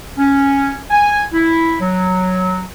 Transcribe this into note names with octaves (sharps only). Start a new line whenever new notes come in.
C#4
G#5
E4
F#3